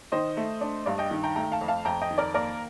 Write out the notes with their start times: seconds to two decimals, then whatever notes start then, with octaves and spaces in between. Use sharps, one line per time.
0.12 D#3 C5 D#5
0.37 A3
0.61 D4
0.86 G2 D5 F5
0.98 D#5 G5
1.11 D#3
1.23 G5 A#5
1.36 A3 G5 A#5
1.52 F5 A5
1.61 F2
1.68 F5 A5
1.85 F2 G5 A#5
2.01 D#5 G5
2.11 D#3
2.18 A#4 D5
2.34 A#3 A#4 D5